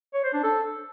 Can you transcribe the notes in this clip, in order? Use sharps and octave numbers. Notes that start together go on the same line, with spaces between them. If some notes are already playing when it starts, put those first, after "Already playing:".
C#5
C5
D4
A4